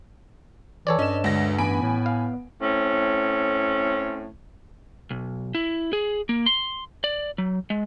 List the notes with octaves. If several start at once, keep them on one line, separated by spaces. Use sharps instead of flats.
E3 A4 C#5 D5
G2 C#4 D#5 E7
D2 G#3 A#6
A1 B3 G#5 B5 D7
A2
F5
A2 C4 C#4
B1
E4
G#4
A#3
C6
D5
F#3
G#3